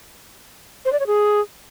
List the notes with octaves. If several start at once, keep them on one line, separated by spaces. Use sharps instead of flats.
C5
D5
C#5
G#4